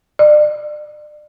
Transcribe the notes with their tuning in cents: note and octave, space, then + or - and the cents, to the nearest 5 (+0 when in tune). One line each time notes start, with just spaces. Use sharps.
D5 +35